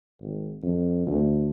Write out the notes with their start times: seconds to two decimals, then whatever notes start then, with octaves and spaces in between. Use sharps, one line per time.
0.21 G#1
0.63 F2
1.06 D2